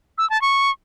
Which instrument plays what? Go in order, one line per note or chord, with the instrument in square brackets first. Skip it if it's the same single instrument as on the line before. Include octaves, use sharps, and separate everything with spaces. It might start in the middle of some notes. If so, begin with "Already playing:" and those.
[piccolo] E6
A5
C#6